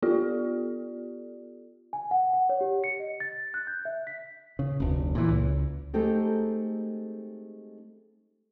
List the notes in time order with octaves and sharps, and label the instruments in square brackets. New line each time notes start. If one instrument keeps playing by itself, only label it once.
[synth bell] B3 F4 G4 A4 D5
[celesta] G#5
F#5
F#5
C#5
G4
C#7
D#5
A6
F#6
G6
E5
B6
[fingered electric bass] C#3
F1 D2
A#2 E3
C#2
[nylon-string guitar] G#3 A3 C4 D#4 G4 A4